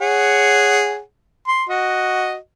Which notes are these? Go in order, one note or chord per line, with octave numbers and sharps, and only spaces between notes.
G#4 C#5 F#5
C6
F#4 D#5